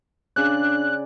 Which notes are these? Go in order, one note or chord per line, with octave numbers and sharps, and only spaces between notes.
C#3 D4 D5 F#6